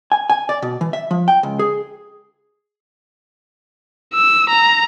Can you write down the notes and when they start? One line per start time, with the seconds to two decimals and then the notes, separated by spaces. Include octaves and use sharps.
0.12 G#5
0.30 G#5
0.49 D5
0.62 B2
0.81 E3
0.93 E5
1.11 F3
1.28 G5
1.43 C#2
1.59 G#4
4.14 E6
4.50 A#5